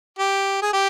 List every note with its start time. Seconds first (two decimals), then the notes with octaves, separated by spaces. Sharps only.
0.19 G4
0.62 G#4
0.73 G4